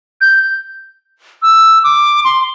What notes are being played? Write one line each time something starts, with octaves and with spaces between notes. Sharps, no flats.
G6
E6
D6
C6